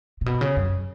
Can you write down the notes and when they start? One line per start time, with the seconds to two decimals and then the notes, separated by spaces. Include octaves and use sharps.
0.21 A#2
0.26 B2
0.41 C#3
0.57 F#2